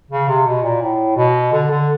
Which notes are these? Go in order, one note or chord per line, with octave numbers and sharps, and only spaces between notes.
C#3
C3
B2
A#2
A2
B2
D3
D3